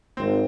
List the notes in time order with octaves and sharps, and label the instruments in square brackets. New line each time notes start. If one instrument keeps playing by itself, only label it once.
[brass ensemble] G#1 [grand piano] C4